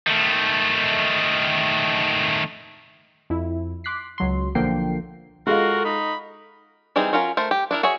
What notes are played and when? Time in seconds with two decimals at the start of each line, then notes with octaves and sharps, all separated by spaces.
0.07 D#3 A3
3.30 F2 E4
3.84 C6 D6 F#6 B6 C7
4.18 C#2 F#3 C6
4.55 B1 D3 F3 A#3 G5 C7
5.47 G#3 F4 F#4 A4 A#4
5.85 D#4 B5
6.96 E3 G3 C4 D#4 G#4
7.13 F#3 C#4 F4 A#4 A#5
7.37 A3 A#4 C5
7.51 G4
7.71 D4 E4 A#4
7.83 F#4 G#4 C#5 E5